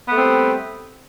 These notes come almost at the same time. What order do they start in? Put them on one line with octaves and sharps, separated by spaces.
B3 A3 C4 G3